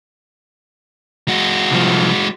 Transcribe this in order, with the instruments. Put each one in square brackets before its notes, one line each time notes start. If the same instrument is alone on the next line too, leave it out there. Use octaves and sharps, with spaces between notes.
[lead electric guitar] G#3 F#4
[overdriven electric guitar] C2 F3